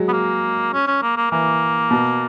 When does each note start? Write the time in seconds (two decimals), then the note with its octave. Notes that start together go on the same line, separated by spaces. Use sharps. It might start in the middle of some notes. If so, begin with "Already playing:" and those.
Already playing: F#3 G#3
0.08 B3
0.13 A#3
0.73 C#4
0.87 C#4
1.02 A#3
1.17 A#3
1.31 E3 A#3
1.91 B2